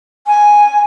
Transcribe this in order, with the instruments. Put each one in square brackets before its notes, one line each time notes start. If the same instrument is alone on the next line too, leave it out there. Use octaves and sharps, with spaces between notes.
[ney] G#5